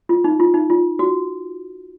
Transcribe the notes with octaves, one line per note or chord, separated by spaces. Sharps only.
F4
D#4
F4
D#4
F4
F#4